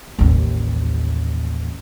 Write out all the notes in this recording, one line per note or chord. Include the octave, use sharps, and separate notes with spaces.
A1 D#2